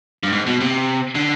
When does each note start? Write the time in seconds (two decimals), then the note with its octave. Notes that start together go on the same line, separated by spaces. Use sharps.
0.23 G2
0.33 G#2
0.47 B2
0.61 C3
1.15 D3